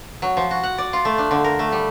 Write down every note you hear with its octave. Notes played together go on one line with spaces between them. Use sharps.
F#3
F3
F#4
F#5
D5
F4
A3
D4
D3
A#4
A3
G3